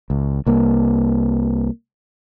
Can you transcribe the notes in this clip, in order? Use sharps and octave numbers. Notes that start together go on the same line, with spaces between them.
C#2
C2 A#3